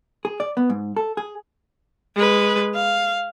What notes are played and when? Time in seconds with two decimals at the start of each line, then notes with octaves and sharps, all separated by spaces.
0.25 G#4
0.40 D5
0.57 B3
0.70 G#2
0.97 A4
1.17 G#4
2.16 G#3 B4
2.75 F5